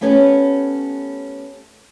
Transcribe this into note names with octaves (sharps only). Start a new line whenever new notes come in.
A3 B3 C#4 G4 B4